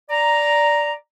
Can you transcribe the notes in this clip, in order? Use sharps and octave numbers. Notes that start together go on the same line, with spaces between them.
D5 A#5